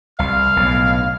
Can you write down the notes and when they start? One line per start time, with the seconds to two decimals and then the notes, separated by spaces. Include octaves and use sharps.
0.19 C2 F5 F6
0.56 B1 A2